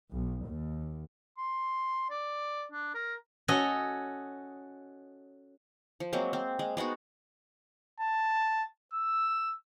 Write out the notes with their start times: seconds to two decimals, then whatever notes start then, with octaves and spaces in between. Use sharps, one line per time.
0.11 B1
0.46 D#2
1.38 C6
2.10 D5
2.72 D4
2.95 A#4
3.48 C#4 F#4 A4 C#5 D#5
6.00 F3
6.13 F#3 G#3 A#3 C4
6.33 C4
6.59 G#3
6.77 G#3 B3 D#4 F#4
8.00 A5
8.93 E6